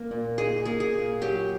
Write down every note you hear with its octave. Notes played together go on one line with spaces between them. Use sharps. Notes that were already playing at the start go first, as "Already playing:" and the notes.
Already playing: A#3
A#2
D#4 G#4
A#3 G#4
G#4
A#2
F#3 G4